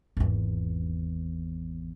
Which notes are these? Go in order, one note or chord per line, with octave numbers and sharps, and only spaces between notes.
G#1 E2